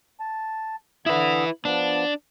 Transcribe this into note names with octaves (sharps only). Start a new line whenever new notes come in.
A5
D3 E4 B4 E5 D#6
F3 B3 D4